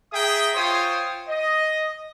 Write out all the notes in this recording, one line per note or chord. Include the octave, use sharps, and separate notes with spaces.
G#4 E5 G5 A#5 D#6
F4 C5 C#5 G5 D#6
D#5